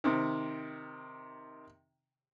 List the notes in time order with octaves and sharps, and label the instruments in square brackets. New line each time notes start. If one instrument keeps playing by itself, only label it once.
[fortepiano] C3 D#3